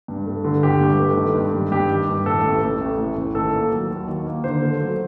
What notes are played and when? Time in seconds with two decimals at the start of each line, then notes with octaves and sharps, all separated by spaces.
0.08 G2
0.26 A3
0.45 D3
0.63 G1 G4
0.81 G2
0.99 A3
1.17 D#3
1.35 G2
1.54 G3
1.72 G2 G4
1.90 D#3
2.08 G2
2.26 A2 A4
2.44 A1
2.62 A3
2.81 A1
2.99 A2
3.17 A1
3.35 D#3 A4
3.53 A#3
3.72 F#3
3.90 D#2
4.08 D#3
4.26 A#3
4.44 D3 C5
4.62 A3
4.80 F#3